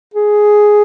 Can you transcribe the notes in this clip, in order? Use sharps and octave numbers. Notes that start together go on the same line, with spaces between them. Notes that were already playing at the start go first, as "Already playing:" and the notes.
G#4